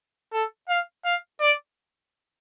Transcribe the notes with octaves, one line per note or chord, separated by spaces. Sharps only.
A4
F5
F5
D5